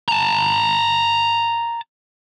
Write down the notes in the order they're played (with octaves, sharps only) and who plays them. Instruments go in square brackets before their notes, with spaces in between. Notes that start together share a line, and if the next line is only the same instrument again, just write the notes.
[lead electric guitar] A5 A#5